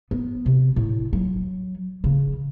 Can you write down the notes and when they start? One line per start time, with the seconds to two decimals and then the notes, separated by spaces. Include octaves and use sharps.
0.11 B3
0.46 C3
0.76 A2
1.13 F#3
2.04 C#3